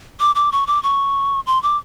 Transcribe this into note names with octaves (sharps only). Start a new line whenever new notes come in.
D6
D6
C#6
D6
C#6
C6
D6